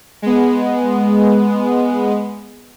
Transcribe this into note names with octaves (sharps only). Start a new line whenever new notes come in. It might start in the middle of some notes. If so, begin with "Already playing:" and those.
G#3 B3